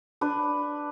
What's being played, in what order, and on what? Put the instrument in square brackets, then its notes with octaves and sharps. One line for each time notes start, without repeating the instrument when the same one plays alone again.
[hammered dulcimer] D4 B4